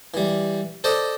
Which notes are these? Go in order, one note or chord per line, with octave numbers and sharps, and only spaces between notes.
E3 G3
A4 C5 D5 D#5 G5 A5